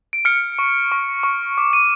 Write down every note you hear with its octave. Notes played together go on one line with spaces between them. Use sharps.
D7
F6 C#7
C#6
C#6
C#6
D6
D#7